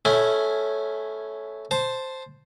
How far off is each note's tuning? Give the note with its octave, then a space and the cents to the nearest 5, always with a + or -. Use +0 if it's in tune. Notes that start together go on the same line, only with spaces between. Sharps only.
A3 -15 C#4 +0 E4 +10
C5 +0 A5 +0